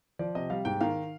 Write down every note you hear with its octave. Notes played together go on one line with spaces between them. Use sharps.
F3 D5
C3 D#5
G3 F5
G#2 G5
D#3 F5